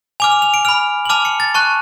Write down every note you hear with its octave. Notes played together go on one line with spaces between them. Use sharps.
G#5 D6 F6 F7
F7
F7
D7
B5 F6 F7
F#7
A5 D6 F6 F7
C#7
A6
A5 C#6 F#6